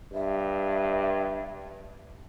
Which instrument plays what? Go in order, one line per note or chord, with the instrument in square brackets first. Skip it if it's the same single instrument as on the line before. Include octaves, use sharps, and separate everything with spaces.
[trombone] G2 [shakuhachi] E5